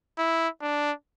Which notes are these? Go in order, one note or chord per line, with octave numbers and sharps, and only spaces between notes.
E4
D4